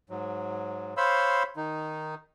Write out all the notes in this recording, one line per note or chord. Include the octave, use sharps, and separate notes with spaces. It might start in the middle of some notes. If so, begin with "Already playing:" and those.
G#2 F#3
C5 C#5 F5 B5 C6 E6
D#3 D#4